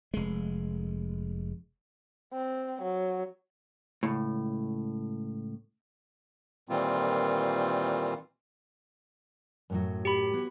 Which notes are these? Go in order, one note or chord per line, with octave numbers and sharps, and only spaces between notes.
F1 G#3
C4
F#3
C#2 A2
A#2 D#3 E3 G3 C4 F4
F#2 A2 F#3
G4 B5
B3 F#4 C#5